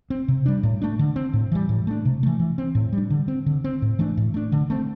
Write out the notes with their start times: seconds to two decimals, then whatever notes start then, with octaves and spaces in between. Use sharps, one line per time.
0.10 C4
0.28 C3
0.46 G3 D4
0.63 A2
0.82 A3 D4
0.99 D3
1.16 C4
1.33 A2
1.52 E3 G3
1.69 A2
1.87 A3 D4
2.05 C3
2.23 E3 A3
2.39 E3
2.58 C4
2.75 A2
2.93 G3
2.98 D4
3.10 D3
3.28 C4
3.46 D3
3.64 C4
3.82 A2
3.99 E3 A3 D4
4.17 A2
4.34 A3 D4
4.52 D3
4.70 A3 C4